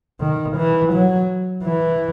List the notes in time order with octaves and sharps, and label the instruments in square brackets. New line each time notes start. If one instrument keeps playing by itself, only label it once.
[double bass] D#3
E3
F#3
E3